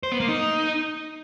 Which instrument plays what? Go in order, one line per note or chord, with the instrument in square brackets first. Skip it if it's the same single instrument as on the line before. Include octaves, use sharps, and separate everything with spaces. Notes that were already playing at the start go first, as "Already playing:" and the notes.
[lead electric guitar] C5
B3
A#3
D#4